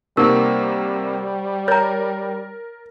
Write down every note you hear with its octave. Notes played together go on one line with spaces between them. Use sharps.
C3 G3 A#3 D#4 A#4 C5 F#5 C#6
A#4 C#5 A#5 A6